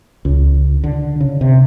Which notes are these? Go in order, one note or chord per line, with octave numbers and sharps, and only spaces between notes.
C#2
D3
C#3
C3